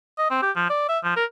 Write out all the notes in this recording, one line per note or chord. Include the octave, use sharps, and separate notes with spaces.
D#5
C4
G4
F3
D5
E5
F3
A#4